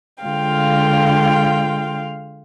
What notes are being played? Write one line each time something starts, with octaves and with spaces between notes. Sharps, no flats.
D3 G#3 F4 F5 G5